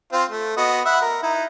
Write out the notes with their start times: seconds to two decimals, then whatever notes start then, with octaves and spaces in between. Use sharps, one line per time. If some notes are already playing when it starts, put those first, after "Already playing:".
0.13 C4 F4 C5
0.31 A3
0.57 B3 F#4 D#5
0.86 E5 F#5 B5
1.02 A#4
1.23 D#4 E4